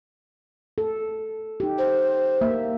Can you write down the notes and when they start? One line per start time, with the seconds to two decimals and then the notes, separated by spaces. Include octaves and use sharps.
0.78 A4
1.60 D#4 G4
1.78 C5
2.41 A#3 E5